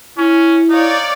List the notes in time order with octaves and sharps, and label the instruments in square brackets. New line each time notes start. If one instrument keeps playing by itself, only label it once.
[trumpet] C#4 [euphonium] E4
[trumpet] D#4 [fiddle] C#5 F5 [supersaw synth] D5